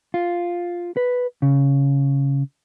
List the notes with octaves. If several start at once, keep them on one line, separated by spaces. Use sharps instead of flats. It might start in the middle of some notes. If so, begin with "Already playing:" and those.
F4
B4
C#3